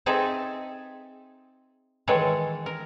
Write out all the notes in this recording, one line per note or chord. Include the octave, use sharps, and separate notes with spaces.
C4 D#4 G#4 A4 E5
D#3 E3 G#3 A4 C#5
A#4